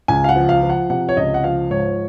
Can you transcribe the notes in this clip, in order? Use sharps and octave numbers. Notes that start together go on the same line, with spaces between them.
C#2 G#5
F5
F#5
F3
F5
F3
F#5
C3 F#5
C#5
C#2 D#5
F#5
F3 F5
G#2 C#5